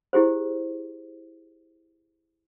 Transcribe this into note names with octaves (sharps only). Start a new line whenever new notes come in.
E4 G4 G#4 C5